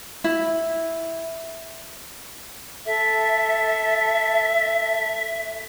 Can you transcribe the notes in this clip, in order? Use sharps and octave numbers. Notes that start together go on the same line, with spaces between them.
E4
A4 E5